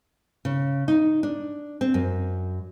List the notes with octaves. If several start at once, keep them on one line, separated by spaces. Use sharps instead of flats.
C#3
D#4
D4
C4
F#2